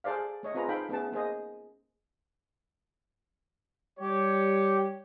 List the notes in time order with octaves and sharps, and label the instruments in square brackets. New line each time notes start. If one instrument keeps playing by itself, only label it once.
[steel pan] G#4 A4 C5 D5 F5
A3 C#5 D#5
C4 F4 G#4 B4 A#5
D#4 A4 C5 F5 G5 B5
A3 B3 C#4 G#4 A5
A#3 G#4 C5 D#5
[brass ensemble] G3 C#5 [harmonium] G4